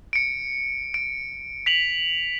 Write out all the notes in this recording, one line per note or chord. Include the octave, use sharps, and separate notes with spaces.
C#7 D7
D7
B6 F7 F#7